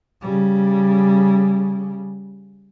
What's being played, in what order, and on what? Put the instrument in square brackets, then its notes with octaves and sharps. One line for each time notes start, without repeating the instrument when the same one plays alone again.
[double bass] C#3 G3